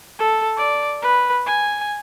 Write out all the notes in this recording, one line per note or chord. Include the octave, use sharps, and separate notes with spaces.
A4
D5
B4
G#5